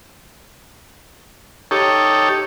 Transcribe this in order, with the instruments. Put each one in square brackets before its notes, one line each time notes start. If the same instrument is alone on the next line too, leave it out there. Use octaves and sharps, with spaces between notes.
[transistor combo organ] D#4 G4 A4 C#5